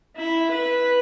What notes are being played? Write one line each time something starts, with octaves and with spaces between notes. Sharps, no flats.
E4
B4